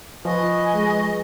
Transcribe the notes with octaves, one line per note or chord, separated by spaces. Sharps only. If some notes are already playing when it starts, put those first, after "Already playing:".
F3 B4 D#5 G#5 C#6
G#3